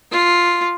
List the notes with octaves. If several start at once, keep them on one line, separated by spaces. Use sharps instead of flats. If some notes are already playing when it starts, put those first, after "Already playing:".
F4